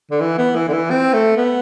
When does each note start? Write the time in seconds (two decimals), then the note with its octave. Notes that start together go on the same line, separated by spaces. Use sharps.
0.11 D3
0.21 E3
0.38 B3
0.55 E3
0.68 D3
0.73 E3
0.90 C4
1.14 A3
1.37 B3